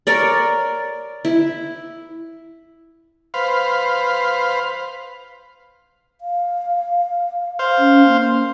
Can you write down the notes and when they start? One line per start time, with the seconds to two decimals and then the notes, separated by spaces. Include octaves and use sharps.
0.07 A#4 C#5 D5
1.25 E4
3.34 B4 C5 F5
6.21 F5
7.59 C5 F5
7.78 C#4
8.08 A#3